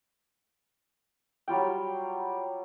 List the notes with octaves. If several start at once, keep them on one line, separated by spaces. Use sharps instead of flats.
F#3 G3 F4 G5